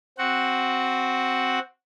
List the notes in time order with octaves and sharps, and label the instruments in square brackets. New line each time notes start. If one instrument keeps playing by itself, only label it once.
[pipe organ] C4 F#4 F#5